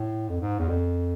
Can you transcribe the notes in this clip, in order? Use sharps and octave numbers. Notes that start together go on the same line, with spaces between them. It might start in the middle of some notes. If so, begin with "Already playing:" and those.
Already playing: A2
F2
G#2
E2
F2